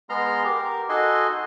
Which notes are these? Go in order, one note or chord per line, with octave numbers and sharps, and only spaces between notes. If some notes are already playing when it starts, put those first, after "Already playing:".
G#3 B3 A#5 C6 F6
G4 A#4
D#4 F#4 A4 D#5 G#5 C6